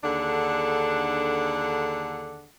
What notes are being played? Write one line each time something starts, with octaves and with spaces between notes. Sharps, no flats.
D#2 D3 D4 G#4 A4 F#5